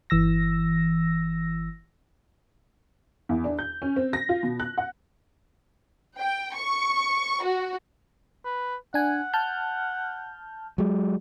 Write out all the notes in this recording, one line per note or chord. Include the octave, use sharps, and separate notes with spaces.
G1 E3 E6 A#6
E2
D4
G6
C#4
C4
A#6
F4
B2
F#6
F#5
G5
C#6
F#4
B4
D4 F#5 G#5
A5 F6 G6
F#3 G#3